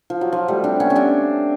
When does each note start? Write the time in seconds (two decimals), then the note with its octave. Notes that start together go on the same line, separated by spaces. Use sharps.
0.10 F3
0.21 F#3
0.32 F3
0.48 G3 A3
0.64 C4 D4
0.80 B3 C#4
0.90 C#4
0.96 C4 D4